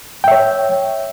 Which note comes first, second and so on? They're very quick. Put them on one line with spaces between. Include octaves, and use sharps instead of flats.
G5 E5 C#5